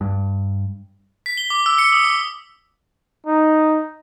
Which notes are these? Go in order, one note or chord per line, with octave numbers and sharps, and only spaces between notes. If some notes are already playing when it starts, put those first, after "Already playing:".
G2
B6
G7
D6
E6
C#7
D#6
D6
D#4